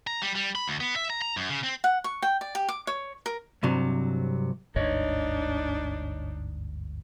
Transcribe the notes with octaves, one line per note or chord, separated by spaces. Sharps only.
A#5
G3
G3
B5
D2
B3
E5
A#5
A#5
F#2
C#3
C4
F#5
C#6
G5
D5
G4
D6
C#5
A#4
C2 G2 C3 F#3
G1 D2 G#2 D4 D#4 C#5 D#5